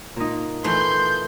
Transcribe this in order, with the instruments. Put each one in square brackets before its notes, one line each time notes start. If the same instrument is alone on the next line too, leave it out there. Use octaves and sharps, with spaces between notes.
[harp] A#2 D#4
[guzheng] E3 A3 [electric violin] C6 G6